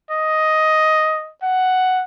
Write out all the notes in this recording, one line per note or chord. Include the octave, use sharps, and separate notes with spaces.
D#5
F#5